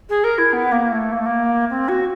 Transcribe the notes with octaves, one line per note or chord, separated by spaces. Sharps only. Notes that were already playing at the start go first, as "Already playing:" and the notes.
G#4
A#4
E4
B3
A#3
A3
A#3
A3
A#3
C4
F#4